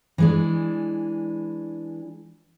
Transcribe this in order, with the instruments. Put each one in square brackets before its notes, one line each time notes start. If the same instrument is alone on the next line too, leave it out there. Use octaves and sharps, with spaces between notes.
[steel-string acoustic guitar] E3 G#3 D4